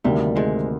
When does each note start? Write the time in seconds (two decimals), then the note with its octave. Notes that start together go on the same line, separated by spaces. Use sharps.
0.04 D2 G2 C3 D#3 G3 A#3
0.36 G#2 G#3